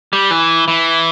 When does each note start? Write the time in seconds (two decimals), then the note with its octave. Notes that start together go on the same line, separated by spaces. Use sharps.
0.13 G3
0.31 E3
0.68 E3